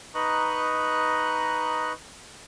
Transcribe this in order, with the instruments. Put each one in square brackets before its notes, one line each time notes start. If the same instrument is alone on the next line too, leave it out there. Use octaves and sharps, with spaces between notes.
[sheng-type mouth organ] D#4 B4 D#5 A#5 C#6 F#6